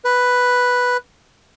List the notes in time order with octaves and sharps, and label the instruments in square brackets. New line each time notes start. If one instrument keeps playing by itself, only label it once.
[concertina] B4